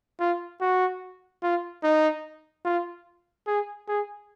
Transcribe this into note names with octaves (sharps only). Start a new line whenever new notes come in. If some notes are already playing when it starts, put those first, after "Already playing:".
F4
F#4
F4
D#4
F4
G#4
G#4